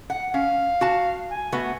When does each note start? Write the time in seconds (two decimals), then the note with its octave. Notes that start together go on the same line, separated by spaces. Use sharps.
0.10 F#5
0.34 C#4 F5
0.81 F#4 A5
1.31 G#5
1.52 A3 B3 F#4